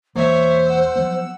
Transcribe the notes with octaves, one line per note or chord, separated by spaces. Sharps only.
E1 E3 A#3 C5 C#5 E5
F#5 E6
F3 F#3 B3